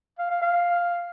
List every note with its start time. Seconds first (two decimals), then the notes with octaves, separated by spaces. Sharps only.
0.19 F5
0.30 F5
0.41 F5